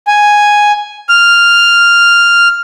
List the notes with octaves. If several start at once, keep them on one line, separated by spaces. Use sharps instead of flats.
G#5
F6